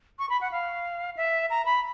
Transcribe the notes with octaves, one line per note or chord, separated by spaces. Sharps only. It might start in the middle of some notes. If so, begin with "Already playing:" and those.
C#6
B5
F#5
F5
E5
A#5
B5